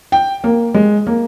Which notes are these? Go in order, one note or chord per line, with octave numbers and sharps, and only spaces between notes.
G5
A#3
G#3
A#3